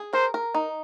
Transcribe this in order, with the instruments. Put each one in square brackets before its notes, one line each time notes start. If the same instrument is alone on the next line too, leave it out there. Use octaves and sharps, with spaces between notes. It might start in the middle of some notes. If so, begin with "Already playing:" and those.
Already playing: [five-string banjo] G#4
[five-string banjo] A#4 [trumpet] C5
[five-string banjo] A#4
D#4